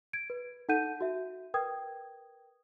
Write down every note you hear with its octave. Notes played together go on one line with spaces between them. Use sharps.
G#6 D7
B4
D#4 A4 F#5 G6 D#7
F#4 E5
A#4 B4 G5 D#6 G#6